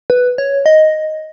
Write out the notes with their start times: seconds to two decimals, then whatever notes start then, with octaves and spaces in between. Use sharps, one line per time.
0.10 B4
0.38 C#5
0.66 D#5